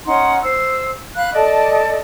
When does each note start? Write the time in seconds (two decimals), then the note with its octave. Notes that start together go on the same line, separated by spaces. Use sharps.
0.05 C#4 D#4 F#5 C6
0.42 C5 E6
1.16 F5 B5 F#6
1.33 A4 D5 D#5 A5